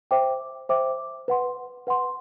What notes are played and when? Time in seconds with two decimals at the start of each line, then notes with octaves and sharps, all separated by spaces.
0.11 C5 E5 G5 D6
0.69 C5 E5 G5 D6
1.28 B4 F#5 C6
1.87 B4 F#5 C6